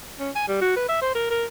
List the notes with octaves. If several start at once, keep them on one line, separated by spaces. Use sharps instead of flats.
C#4
G#5
G3
F#4
B4
E5
C5
A#4
A#4